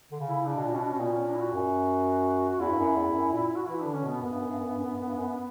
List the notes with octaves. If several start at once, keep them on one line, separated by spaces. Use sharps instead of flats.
D3
C#3
E4
E4
C#3 D4
B2
A#2
B2 C#4
D4
B2 C#4
A#2 B3
C#4
D4
E4
F#4
F#2
F#4
E2 E4
G2
F#2
E2
F#2
A#2
F#4
E3 E4
D3 D4
C#4
B2 B3
F#2 B3
G2
F#2
G2
F#2
G2
F#2
G2
F#2
G2
F#2